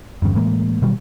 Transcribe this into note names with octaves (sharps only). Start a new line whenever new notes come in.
G1 E2 G2 C#3
A2 E3 G#3 A#3
B2 D#3 F#3 G3